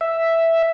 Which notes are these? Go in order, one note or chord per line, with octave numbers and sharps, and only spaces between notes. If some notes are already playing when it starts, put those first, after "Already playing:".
E5